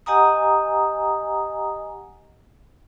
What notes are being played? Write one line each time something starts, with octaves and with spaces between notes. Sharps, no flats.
G4 D#5 F#5 G#5 A#5 D#6